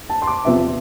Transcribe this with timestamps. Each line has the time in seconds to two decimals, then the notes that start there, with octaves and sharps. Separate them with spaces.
0.10 A5
0.22 C6
0.27 D6
0.45 E2 C3 F3 B3 E5